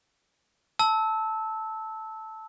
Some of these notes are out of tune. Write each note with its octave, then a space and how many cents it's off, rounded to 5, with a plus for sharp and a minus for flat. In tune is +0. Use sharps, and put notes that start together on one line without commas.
A5 +0 E6 -15